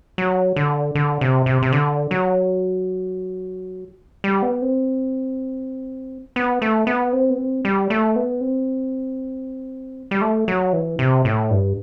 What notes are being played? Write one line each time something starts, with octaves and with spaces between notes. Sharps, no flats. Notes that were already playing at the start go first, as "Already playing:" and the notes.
F#3
D3
D3
C3
C3
C3
D3
F#3
G3
B3
C4
B3
A3
B3
C4
B3
C4
G3
A3
B3
C4
G3
A3
F#3
E3
C3
A2
G2